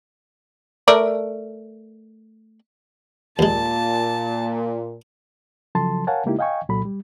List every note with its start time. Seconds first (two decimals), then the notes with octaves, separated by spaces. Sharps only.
0.88 A3 A#4 D5
3.39 D#2 A#2 G#3 A5
5.75 C#3 F3 F#3 A4 A5 C6
6.07 A#4 C#5 F5 F#5 G#5 A5
6.26 C#3 G#3 A#3 D#4 E4 G4
6.39 D#5 F5 G5 G#5 C#6
6.69 C2 A#2 F#3 A4 B5
6.85 G3